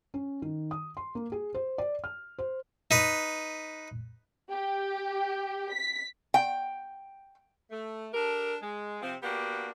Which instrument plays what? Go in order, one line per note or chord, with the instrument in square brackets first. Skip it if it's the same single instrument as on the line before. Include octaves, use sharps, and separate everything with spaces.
[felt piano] C#4
D#3
D#6
C6
A#3
G#4
C5
D5
F6
C5
[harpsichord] D#4 B4
[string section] G4
B6
[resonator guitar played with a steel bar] G5
[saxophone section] A3
D4 G4 A4 A#4
G#3
C3 F3 C4
A#3 B3 D4 F#4 G4